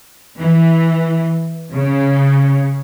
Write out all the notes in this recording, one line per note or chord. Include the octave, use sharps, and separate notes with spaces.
E3
C#3